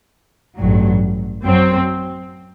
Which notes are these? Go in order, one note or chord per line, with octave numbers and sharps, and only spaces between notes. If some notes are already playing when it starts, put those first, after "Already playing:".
A1 G2 F#3
F#2 F#3 C4